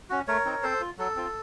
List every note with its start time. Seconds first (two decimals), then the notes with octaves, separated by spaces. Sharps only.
0.10 C#4 F#4
0.27 A3 A#4 C#5
0.45 C4 D#4
0.63 C4 A4 C5
0.80 F4
0.98 F#3 A4
1.16 C4 F4